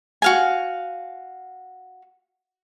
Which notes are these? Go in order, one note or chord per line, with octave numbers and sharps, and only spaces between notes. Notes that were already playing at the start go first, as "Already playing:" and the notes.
F#4 F5 G#5